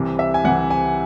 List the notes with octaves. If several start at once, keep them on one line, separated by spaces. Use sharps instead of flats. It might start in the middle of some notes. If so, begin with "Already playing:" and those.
Already playing: C2 C3 E3
E5
G#5
C2 C3 E3 F#5
G#5